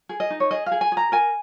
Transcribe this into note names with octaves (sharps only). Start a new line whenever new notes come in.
G#4
D#5
D#4
C#5
G#4 D#5
F5
G#4
G#5
G#4
A#5
A#4 G#5